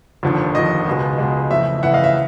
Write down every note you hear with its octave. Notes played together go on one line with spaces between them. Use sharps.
F1 D#2 D3 F3
F1 D#2 D3 F3 D#5
C#2 B2 G#3
C#2 B2 G#3
F2 C#3 E3 A3 E5
F2 C#3 E3 A3 E5 F#5
D#5 F5
E5